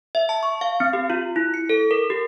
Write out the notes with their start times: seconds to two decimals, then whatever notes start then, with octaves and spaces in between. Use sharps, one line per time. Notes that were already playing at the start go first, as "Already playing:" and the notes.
0.15 E5
0.29 A5
0.43 C#6
0.61 F5
0.80 C4
0.93 G4
1.10 F4
1.36 E4
1.54 C#7
1.69 A4
1.91 A#4
2.10 G4